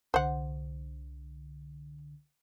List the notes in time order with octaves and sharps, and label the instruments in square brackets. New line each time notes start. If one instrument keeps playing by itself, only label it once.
[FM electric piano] C2 D3 [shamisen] C5 F#5